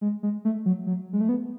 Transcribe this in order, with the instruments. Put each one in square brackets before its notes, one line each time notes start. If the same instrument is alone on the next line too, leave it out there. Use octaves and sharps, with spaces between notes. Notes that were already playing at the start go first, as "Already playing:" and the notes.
[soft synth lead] G#3
G#3
A3
F#3
F#3
G#3
A3
B3